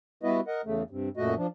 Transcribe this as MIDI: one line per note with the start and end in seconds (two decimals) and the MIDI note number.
0.23 0.40 55
0.23 0.40 59
0.23 0.40 64
0.23 0.40 66
0.23 0.40 71
0.23 0.40 75
0.47 0.61 70
0.47 0.61 75
0.47 0.61 78
0.65 0.83 40
0.65 0.83 49
0.65 0.83 57
0.90 1.09 43
0.90 1.09 48
1.17 1.35 42
1.17 1.35 46
1.17 1.35 57
1.17 1.35 66
1.17 1.35 75
1.37 1.47 53
1.37 1.47 62